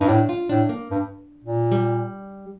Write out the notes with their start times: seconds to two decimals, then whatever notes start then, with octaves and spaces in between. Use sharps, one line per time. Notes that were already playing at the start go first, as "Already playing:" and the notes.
0.01 G2 D#4
0.09 A2 D4
0.29 F4
0.49 A2 D4
0.69 A#3
0.91 G2
1.44 A#2
1.72 G3